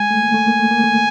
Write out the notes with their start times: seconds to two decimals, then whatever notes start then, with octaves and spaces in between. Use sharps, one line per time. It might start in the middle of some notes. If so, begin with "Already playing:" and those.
Already playing: G#3 G#5
0.11 A3
0.23 A#3
0.34 A3
0.47 A#3
0.59 A3
0.71 A#3
0.84 A3